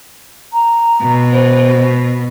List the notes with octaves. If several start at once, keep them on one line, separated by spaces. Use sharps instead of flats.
A#5
B2
C5